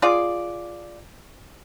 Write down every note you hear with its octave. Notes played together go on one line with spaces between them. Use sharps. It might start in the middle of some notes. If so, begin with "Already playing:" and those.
F4 G#4 D5